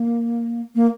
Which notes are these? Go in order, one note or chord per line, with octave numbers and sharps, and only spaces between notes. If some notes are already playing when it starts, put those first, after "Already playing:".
Already playing: A#3
A#3